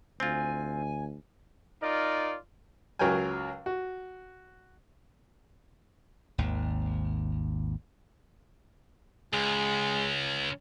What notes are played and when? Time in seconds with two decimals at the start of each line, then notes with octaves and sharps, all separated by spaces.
0.20 D2 C4 F4 G#5
1.83 D#4 F4 A#4 D5
2.99 C#2 F#3 A#4 C#5 G5 G#5
3.66 F#4
6.38 G#1 D#2
9.33 C#2 G#3